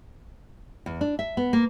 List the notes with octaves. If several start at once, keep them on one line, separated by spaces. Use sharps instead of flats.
E2
D4
E5
B3
A#3